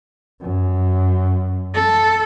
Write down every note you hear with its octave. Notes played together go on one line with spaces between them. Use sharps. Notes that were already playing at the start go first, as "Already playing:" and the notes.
F#2
A4